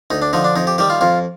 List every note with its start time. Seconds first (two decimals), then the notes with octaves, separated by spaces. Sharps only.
0.11 D2 D#4
0.22 D4
0.33 D3 F3 D#4
0.44 D4
0.56 F2 D#4
0.67 G4
0.78 D#3 G3 G4
0.90 F4
1.01 F2 F4